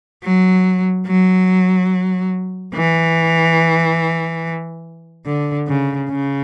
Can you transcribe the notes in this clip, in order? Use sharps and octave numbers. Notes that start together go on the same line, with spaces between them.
F#3
F#3
E3
D3
C#3
C#3